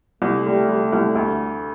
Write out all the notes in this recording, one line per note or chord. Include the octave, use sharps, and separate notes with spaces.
C2 A3
G3
G3
C2
D2